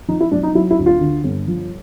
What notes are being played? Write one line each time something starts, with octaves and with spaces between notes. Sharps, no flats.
F3 D#4
E4
B1 D4
D#4
F#3 E4
E4
D2
F4
D3
G1
F3